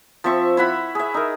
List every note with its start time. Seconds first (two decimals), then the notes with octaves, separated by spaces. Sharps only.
0.24 F3 C4 E5 C#6
0.57 E4 E5 F#5 B5
0.95 G#4 E5
1.14 D#4 A#4